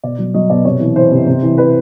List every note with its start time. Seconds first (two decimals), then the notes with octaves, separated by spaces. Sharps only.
0.03 B2 D5
0.18 F#3
0.34 F#3 D#5
0.50 B2 D5
0.65 C3 C#5
0.80 E3
0.96 E3 C5
1.11 C3
1.27 C3
1.43 E3
1.58 E3 B4